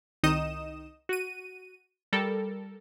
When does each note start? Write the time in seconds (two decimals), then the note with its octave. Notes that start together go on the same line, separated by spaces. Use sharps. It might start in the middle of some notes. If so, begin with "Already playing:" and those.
0.23 C2 D#3 D#4 D#5 D#6 E7
1.09 F#4 D#7
2.13 G3 A4 A#4